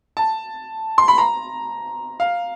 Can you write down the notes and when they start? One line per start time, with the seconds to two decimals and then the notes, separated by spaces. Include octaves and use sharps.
0.17 A5
0.98 C6
1.08 B5
1.18 A#5
2.20 F5